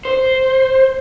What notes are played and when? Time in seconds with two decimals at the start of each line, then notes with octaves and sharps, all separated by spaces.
0.05 C5